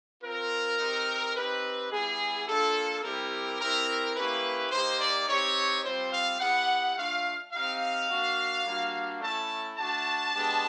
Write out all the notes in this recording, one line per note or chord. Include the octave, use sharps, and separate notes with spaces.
C4 F4 A#4
C4 D#4 G4
C4 D#4 G4 B4
G3 B3 E4 G#4
A#3 D4 F4 A4
G3 C4 E4 G4 A#4
C4 E4 G4 A#4
A#3 C#4 E4 G4 B4
A#3 D#4 G4 C5
D5
C4 D#4 G4 C#5
G3 C4 F4 C5
F5
B3 E4 G4 F#5
A3 D4 F4 F5
C4 D#4 G4 F5
A#3 D4 F#4
G3 A#3 D4 F#4
A3 C#4 E4 A5
A3 D4 F#4 A5
G#3 B3 D4 G4